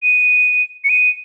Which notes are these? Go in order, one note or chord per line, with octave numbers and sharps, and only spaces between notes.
D#7
C#7
D#7